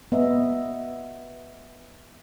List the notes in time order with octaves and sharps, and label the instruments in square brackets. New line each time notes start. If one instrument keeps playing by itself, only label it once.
[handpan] B3 D#5 E5